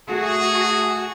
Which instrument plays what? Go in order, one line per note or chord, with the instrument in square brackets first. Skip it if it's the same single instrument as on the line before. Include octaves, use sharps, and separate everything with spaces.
[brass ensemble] A3 G#4 [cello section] F#4